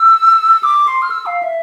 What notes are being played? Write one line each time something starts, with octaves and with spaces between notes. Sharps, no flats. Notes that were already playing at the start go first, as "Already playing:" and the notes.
Already playing: E6
D6
C6
F6
E6
F5
E5